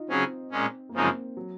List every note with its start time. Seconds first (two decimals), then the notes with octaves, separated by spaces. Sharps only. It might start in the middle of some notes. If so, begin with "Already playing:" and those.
Already playing: D#4 F4
0.08 C#3 F#3 C4 C#4 G#4
0.51 A#2 G#3 C#4
0.89 A#3
0.94 F#2 C#3 F3 G#3 C4 D#4
1.37 F#3